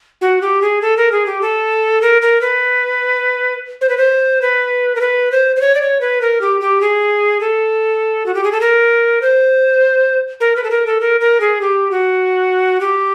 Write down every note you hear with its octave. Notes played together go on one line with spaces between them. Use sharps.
F#4
G4
G#4
A4
A#4
G#4
G4
A4
A#4
A#4
B4
C5
B4
C5
B4
A#4
B4
C5
C5
C#5
D5
C#5
B4
A#4
G4
G4
G#4
A4
F#4
G4
G#4
A4
A#4
C5
A#4
B4
A4
A#4
A4
A#4
A#4
G#4
G4
F#4
G4